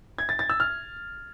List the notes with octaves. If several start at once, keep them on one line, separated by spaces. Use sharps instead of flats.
G#6
A6
A6
E6
F6